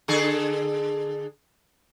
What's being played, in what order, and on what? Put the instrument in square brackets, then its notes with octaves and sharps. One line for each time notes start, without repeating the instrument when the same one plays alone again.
[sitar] D3 G#4 A4